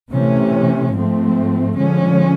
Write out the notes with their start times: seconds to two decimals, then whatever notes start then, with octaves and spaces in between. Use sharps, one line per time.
0.13 C3 E3 A3 C#4
0.95 G#2 F3 A3 C4
1.77 D3 F3 G#3 C#4